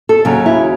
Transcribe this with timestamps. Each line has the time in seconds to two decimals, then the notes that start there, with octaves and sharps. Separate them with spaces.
0.09 A4
0.25 D#2 C#3 F#3
0.46 E4